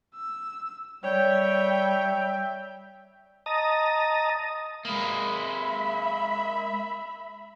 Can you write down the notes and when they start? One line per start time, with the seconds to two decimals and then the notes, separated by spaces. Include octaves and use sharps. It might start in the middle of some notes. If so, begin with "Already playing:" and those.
0.15 E6
1.04 G3 C#5 E5 G5
3.46 D#5 A5 A#5 D#6
4.85 G#3 A#3 E5 B5